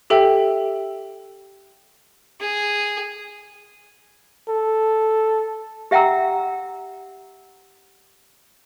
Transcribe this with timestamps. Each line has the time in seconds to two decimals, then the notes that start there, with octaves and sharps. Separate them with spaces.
0.10 G4 A4 E5 G5
2.40 G#4
4.49 A4
5.91 G4 E5 F#5 G5 A#5 E6